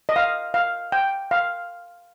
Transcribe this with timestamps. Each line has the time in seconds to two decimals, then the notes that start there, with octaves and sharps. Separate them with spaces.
0.09 D#5
0.16 F5
0.54 F5
0.92 G5
1.31 F5